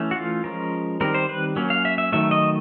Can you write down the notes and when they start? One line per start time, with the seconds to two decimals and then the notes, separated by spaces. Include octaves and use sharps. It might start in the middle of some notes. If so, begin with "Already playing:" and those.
Already playing: E3 A3 C#4
0.11 F#4
0.16 F4
0.44 F3 G#3 C#4 A#4
1.01 D#3 G3 C4 A#4
1.14 C5
1.29 B4
1.56 F#3 A#3 C#4
1.70 F5
1.85 E5
1.98 E5
2.12 D#3 F#3 A3 E5
2.31 D#5